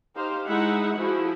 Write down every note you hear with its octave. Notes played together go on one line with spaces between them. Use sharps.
D#4 G4 C5 F5
G#3 D#4 E4 E5 F#5
F3 E4 F#4 G#4